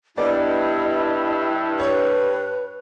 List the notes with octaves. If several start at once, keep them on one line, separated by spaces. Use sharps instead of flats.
G2 B3 E4 D5 D#5 D6
B4 C#5